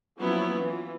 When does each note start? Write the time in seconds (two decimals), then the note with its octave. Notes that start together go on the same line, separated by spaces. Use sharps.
0.19 F3 F#3 A#3 B3 C#4 E4
0.60 E3 F4